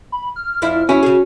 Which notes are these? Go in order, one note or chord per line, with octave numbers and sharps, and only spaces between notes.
B5
F6
F2 D4 E4
E2 C#4 E4 F#4
C#3 G#4